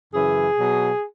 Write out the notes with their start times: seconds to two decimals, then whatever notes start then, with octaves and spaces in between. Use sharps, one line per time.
0.13 F#2 C#3 E3 G#4
0.56 B2 F#3